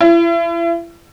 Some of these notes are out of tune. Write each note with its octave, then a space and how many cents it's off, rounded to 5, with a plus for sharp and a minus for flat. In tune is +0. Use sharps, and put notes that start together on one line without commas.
E4 +35